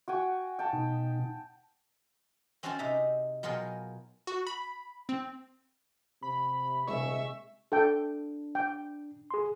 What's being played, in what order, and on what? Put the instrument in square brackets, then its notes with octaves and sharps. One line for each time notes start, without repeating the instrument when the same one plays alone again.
[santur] F#4 G5 G#5
G5 A5
[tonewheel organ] B2 D#4
[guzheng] C4 C#4 F#4 C5 A5 C6
C3 D#4 E5 A#5
B2 F#3 F4 G#4 A#4 G5
[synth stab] F#4
B5
C4
[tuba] C3 [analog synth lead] B5
[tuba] D#1 [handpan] C3 G#3 G#4 [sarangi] E5 [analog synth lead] C#6
[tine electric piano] D4 [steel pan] A4 G5
[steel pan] G5
[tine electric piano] G#4 C6